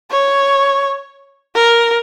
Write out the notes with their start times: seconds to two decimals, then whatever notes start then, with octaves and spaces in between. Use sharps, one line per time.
0.11 C#5
1.55 A#4